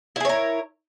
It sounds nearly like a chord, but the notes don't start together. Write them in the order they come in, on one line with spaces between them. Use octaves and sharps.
E4 G#4 C#5 A#4